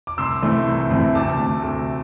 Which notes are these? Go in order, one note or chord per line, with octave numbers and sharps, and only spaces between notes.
D6
C2 C6 E6
C3 E3 A3 C4
C2
C3 E3 A3 C4
D2 A5 D6
C3 A3
D2